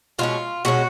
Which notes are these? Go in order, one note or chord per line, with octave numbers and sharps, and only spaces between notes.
B2 G#3 C#4 F4
B2 G#3 C#4 F#4